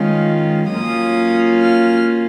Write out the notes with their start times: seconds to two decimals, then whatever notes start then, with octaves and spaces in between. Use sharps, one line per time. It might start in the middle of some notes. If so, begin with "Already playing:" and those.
Already playing: D#3 G#3 C#4 F4
0.72 F#3 A#3 C#4 F4 D#6
1.62 F6